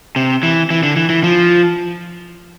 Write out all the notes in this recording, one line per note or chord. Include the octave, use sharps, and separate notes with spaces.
C3
E3
E3
D3
E3
E3
F3